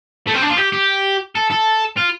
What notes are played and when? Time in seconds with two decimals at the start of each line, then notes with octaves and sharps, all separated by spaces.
0.27 A3
0.34 C4
0.42 D4
0.50 F4
0.57 G4
0.73 G4
1.35 A4
1.50 A4
1.97 F4